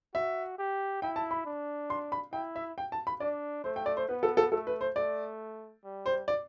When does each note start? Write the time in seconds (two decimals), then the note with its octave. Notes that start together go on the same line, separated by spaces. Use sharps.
0.14 F#4 E5
0.58 G4
1.02 E4 G5
1.16 A5
1.31 B5
1.45 D4
1.90 C6
2.12 B5
2.33 E4 G5
2.56 E5
2.78 G5
2.92 A5
3.07 B5
3.20 D4 D5
3.64 A3 C5
3.76 G5
3.86 D5
3.97 C5
4.09 B3 B4
4.23 A4
4.37 A4
4.52 A3 A4
4.67 B4
4.81 C5
4.96 A3 D5
5.84 G3
6.06 C5
6.28 D5